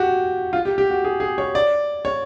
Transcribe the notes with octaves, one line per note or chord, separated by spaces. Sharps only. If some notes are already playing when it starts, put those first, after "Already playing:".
Already playing: F#4 G4
F4
G4
G4
F#4
G#4
G#4
C#5
D5
C#5